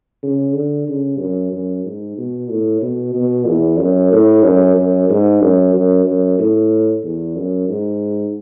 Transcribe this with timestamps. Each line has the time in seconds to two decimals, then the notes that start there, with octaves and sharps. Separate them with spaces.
0.23 C#3
0.55 D3
0.88 C#3
1.20 F#2
1.53 F#2
1.85 G#2
2.18 B2
2.50 A2
2.82 B2
3.15 B2
3.47 E2
3.79 F#2
4.12 A2
4.44 F#2
4.77 F#2
5.10 G#2
5.42 F#2
5.75 F#2
6.06 F#2
6.39 A2
7.04 E2
7.37 F#2
7.69 G#2